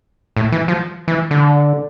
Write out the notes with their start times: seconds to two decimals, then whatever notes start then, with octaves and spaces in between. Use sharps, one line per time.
0.36 A2
0.52 E3
0.68 F3
1.08 E3
1.31 D3